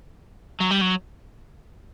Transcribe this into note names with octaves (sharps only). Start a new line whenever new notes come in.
F#3
G3
F#3